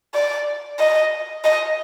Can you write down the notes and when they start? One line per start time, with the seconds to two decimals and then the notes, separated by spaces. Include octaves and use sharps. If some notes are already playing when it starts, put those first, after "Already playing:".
0.14 D5
0.79 D#5
1.44 D#5